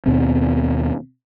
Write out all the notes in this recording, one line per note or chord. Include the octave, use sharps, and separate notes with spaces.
D#2 B2 B3 C4